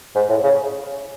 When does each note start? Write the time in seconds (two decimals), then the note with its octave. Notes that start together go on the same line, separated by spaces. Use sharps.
0.15 G#2
0.30 A2
0.44 C#3